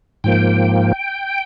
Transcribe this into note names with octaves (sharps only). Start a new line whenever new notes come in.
G#2 F3 A#3 G5